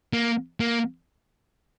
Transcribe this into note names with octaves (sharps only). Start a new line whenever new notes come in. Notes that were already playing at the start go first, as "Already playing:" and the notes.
A#3
A#3